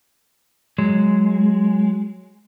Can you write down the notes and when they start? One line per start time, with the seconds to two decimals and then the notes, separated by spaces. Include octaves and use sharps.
0.78 F#3 G#3